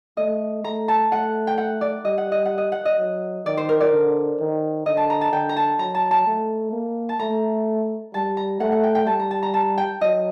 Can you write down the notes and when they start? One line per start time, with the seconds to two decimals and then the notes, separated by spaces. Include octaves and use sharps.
0.17 A3 D#5
0.64 A3 A#5
0.88 A5
1.12 A3 F#5
1.47 G5
1.58 F#5
1.81 D5
2.05 G3 D#5
2.18 F#5
2.32 D#5
2.45 F#5
2.58 D#5
2.72 F#5
2.85 D#5
2.98 F#3
3.45 D#3 D5
3.57 C5
3.69 A#4
3.80 D5
3.92 D3
4.40 D#3
4.86 D3 D#5
4.97 A5
5.10 A#5
5.21 A5
5.32 D3 G5
5.49 A#5
5.56 A5
5.79 F#3 A#5
5.95 A5
6.11 A5
6.27 A3
6.73 A#3
7.09 A5
7.19 A3 A#5
8.14 G3 A5
8.37 A#5
8.60 A3 F#5
8.72 F#5
8.83 G5
8.95 G5
9.07 G3 A5
9.19 A#5
9.31 A5
9.43 A#5
9.54 A5
9.78 G5
10.01 F#3 D#5